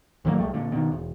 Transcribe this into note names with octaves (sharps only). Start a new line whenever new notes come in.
D#2 A2 F#3 A#3
C2 G2 G3 A3
A#2 D3
B2 D#3
E1